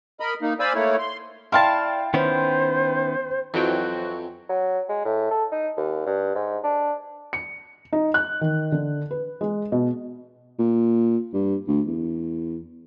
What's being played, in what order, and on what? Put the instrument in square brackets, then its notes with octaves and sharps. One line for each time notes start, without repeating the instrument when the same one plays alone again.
[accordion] A#4 D#5 B5
A#3 D#4
C5 D5 F5 G#5 B5 E6
A3 A#3 E4 C#5
C6
[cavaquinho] E4 F5 A5 [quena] D5 [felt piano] G5 C6 F6
[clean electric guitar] D#3 B3 C#4 [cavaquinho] E4 [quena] C5
[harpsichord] F2 [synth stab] E3 F#3 G5 [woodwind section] C4 F#4
[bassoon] F#3
G#3
A2
A4
D#4
D#2
G2
G#2
D4
[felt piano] C#7
D#4
F#6
D#3
D3
B4
G#3
B2
[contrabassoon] A#2
G2
D2
E2